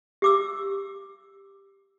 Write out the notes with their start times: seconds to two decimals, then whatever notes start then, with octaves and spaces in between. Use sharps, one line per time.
0.22 G4 D6 E6